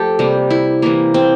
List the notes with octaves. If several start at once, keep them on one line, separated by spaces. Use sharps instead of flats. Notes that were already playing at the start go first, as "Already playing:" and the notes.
Already playing: F3 A3 G4 A4
C3 G3 A#3
E4
C3 E3 A#3
C4